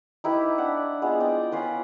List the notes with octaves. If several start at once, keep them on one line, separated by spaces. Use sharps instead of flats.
D#4 E4 G4 B4
D4 F#5
G#3 B3 F4
D5 D#5 G5
C#4 F4 B4 D#5